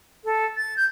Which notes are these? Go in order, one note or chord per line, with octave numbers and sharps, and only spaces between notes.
A4
A6
G6